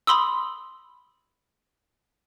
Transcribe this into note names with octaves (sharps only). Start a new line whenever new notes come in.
B5 C6 D#6 E6